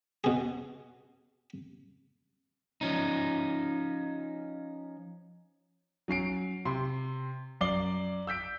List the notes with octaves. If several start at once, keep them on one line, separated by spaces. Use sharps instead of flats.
B2 G#4
F3 C#4 D#4
F#3 C#4 C7 D7
C3 C6
F#2 D5 D6 C7 G7
E6 G6 B6 D7